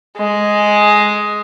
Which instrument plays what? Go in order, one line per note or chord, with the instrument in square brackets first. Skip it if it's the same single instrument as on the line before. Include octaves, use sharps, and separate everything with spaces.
[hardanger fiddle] G#3